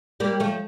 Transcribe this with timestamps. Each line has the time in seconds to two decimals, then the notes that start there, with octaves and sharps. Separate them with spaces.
0.20 G3 A#3
0.40 F3 A3